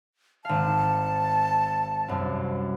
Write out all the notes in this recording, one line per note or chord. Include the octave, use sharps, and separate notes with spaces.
G#1 F5 A5
C2 F#2